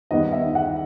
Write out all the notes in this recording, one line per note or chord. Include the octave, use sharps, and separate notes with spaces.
D#2 D#3 G3 B3 D#5
E5
F#5